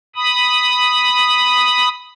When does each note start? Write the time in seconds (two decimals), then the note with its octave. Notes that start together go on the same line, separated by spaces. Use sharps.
0.16 B5 D#6